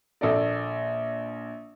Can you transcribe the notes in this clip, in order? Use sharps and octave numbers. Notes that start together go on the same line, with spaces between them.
A#1 A4 D5